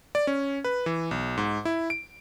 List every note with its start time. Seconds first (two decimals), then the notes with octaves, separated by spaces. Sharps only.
0.15 D5
0.27 C#4
0.64 B4
0.86 E3
1.11 B1
1.37 G#2
1.65 E4
1.90 D7